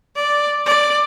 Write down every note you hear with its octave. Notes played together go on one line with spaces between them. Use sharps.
D5
D5